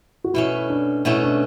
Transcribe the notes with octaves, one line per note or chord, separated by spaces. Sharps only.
F#4
B2 A3 C#4 E4
D4
B2 A3 C#4 E4
D4